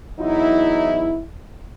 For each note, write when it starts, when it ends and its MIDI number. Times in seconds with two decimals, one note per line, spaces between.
0.20 1.20 40
0.20 1.20 54
0.20 1.20 63
0.20 1.20 64